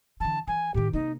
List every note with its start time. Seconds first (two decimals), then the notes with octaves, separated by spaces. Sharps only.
0.20 D3 E3 A5
0.48 E3 G#5
0.74 A2 D#3 G4
0.93 C3 A#3 D#4